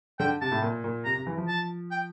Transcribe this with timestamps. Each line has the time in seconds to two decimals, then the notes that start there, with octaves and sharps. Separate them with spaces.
0.19 D3 G5
0.41 C3 A5
0.52 A2
0.62 A#2
0.84 A#2
1.05 C3 A#5
1.16 C3
1.27 E3
1.37 F3
1.48 A5
1.91 G5